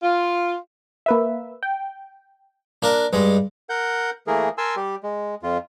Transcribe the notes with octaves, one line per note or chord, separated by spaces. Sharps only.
F4
A#3 B4 E5
G5
A#3 D4 A#4 F#6
G2 G#3
A#4 F#5 G6
E3 A3 A#3 G#4 A#4
A#4 G#5 A5 C6 E6
G3 G4
G#3
F2 F4